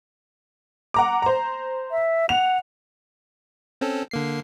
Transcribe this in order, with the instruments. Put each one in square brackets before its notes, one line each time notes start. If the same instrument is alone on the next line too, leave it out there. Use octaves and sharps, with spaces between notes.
[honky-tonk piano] F#5 A#5 D6
C5 A#5
[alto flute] E5
[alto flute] F#5 [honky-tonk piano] F7
[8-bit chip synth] C4 C#4 A4
D3 A#3 C7